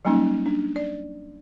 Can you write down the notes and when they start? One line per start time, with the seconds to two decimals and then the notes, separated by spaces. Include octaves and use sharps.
0.05 F#3 G3 A#3 C#4 D#4
0.46 D4
0.76 D5